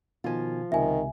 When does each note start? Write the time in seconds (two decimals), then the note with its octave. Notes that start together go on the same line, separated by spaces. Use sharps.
0.24 B2 D#3 F3 F4 G#5
0.72 C#2 C3 D#3 E5 G#5